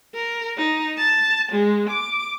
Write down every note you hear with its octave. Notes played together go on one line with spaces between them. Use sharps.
A#4
D#4
A5
G#3
D6